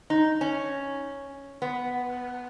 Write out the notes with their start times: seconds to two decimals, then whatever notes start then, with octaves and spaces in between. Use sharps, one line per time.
0.10 D#4
0.41 C#4
1.62 B3